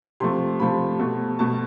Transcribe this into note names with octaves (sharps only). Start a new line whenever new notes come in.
C3 F3 A3 C6
C3 F3 A3 B5
B2 A3
B2 A3 A5